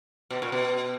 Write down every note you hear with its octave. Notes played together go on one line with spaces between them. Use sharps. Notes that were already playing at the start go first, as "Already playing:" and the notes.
B2
A#2
B2